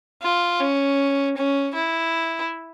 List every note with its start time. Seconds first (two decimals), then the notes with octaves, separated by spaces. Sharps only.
0.23 F4
0.60 C#4
1.37 C#4
1.74 E4